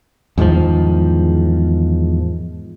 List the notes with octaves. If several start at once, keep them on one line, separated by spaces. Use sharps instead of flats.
E2 G#2 D#3 F3